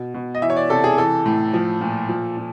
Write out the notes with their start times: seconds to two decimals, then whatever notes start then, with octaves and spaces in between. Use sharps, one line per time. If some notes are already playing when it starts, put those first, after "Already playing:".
Already playing: B2
0.14 B2
0.35 D#5
0.42 E3 E5
0.50 C#5
0.56 D5
0.70 C3 A4
0.84 G#4
0.98 E3 A4
1.26 A2
1.53 F3
1.81 A#2
2.09 F3
2.37 A#2